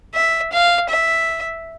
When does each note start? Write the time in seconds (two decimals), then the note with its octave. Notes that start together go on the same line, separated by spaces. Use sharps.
0.14 E5
0.52 F5
0.90 E5